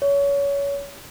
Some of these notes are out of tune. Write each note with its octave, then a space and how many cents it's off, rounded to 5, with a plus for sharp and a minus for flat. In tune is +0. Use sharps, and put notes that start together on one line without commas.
C#5 +25